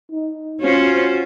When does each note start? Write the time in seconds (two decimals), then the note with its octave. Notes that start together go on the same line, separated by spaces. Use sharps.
0.11 D#4
0.61 C#4 F4 F#4 C5